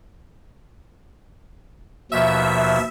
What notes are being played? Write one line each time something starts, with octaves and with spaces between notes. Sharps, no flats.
D#2 B2 F3 E5